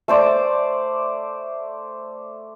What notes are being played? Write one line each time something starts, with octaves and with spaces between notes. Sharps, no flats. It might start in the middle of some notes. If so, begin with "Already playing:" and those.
A3 C5 D5